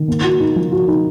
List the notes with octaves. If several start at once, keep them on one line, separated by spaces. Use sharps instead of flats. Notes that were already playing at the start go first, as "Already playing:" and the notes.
Already playing: D#3
A#3
F#4
D#4
F3
F#4
D#4